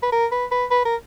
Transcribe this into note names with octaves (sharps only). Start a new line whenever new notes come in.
B4
A#4
B4
B4
B4
A#4